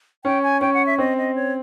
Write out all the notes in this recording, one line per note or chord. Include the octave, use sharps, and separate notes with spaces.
C#4 G5
G#5
C#4 G5
F#5
E5
C4 D#5
D#5
C#5